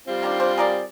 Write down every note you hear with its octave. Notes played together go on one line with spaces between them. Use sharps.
G3 C4 F4
D#3 D4
D4 C5
G#4 A#4 D5